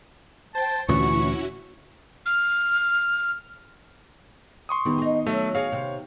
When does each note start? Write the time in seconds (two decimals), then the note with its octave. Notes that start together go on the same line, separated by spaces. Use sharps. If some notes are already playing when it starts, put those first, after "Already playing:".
0.55 C5 G5 A5
0.88 D2 A#2 E3 C#4 E4 F#4 C#6
2.26 F6
4.69 C6 C#6 D#6
4.85 E2 D#3 G3 B3
4.98 D#4 G#4
5.26 F#3 A3 E5
5.55 F#4 G#4 C#5 F5
5.72 C3